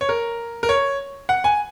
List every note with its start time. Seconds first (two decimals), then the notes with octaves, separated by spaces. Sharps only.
0.01 C#5
0.09 A#4
0.63 A#4
0.69 C#5
1.29 F#5
1.44 G#5